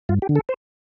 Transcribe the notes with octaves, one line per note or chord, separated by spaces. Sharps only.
G2 F4
G4
D3
A4
C5